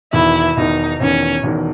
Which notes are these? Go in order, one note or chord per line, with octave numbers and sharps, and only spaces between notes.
E1 E2 D#3 E4
E1 E2 D#3 D#4
E1 E2 D#3 C#4
E1 E2 D#3